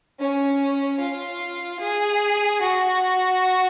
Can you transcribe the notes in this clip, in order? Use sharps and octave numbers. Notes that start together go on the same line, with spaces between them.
C#4
F4
G#4
F#4